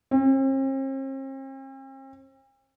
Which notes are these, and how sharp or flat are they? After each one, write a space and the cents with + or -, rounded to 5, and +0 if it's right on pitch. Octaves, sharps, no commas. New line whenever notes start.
C4 +45